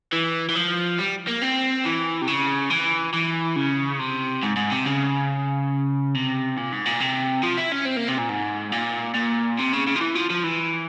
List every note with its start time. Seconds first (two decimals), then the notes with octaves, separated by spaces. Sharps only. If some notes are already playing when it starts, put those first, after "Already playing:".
0.13 E3
0.49 E3
0.55 F3
0.99 G3
1.27 A#3
1.42 C4
1.85 E3
2.22 C3
2.28 C#3
2.70 E3
3.14 E3
3.56 C#3
4.00 C3
4.43 G#2
4.56 G#2
4.71 C3
4.86 C#3
6.15 C3
6.57 A#2
6.72 G#2
6.86 A#2
7.00 C3
7.43 F3
7.58 E4
7.72 C#4
7.86 C4
7.97 A#3
8.08 C3
8.18 A#2
8.29 G#2
8.72 A#2
9.15 A#2
9.59 C3
9.73 C#3
9.87 C#3
9.96 F3
10.01 E3
10.15 F3
10.30 F3
10.44 E3